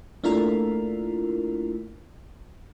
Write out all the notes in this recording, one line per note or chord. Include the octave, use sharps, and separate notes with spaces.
A3 A#3 D4 E4 F4 A#4